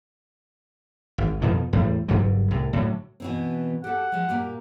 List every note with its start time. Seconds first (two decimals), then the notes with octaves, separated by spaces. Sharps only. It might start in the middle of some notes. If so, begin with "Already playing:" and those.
1.18 G#1
1.42 F2 B2 D#3 F3
1.73 E2 A2 G3
2.08 F#1 G2 F#3 G3
2.51 C2 A2
2.73 A2 D3 F#3
3.20 B2 E3 C4
3.84 G4 A4 F#5
4.12 F3 G#3
4.29 A#2 A#3 G4